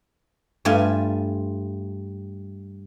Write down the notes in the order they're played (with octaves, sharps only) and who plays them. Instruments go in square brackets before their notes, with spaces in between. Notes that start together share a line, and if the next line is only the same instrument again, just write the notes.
[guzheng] G2 A3 F4 G#5